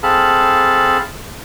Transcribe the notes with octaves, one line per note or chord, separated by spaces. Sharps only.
C4 G#4 A4 F5 A5 B5